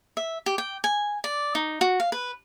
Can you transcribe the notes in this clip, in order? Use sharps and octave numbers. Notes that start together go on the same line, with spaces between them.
E5
G4
G5
G#5
D5
D#4
F#4
F5
B4